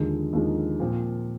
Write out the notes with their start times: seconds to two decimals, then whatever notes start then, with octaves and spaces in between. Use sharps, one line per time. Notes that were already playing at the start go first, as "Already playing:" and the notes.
Already playing: D#2 D3 F3 G#3 D#4
0.33 D#2 D3 F3 G#3 D#4
0.80 A#2 F3 C4